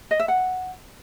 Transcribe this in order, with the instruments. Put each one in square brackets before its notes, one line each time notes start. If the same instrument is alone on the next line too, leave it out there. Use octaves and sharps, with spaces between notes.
[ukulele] D#5
E5
F#5